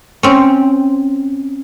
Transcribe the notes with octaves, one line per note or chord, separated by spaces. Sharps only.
C4 C#4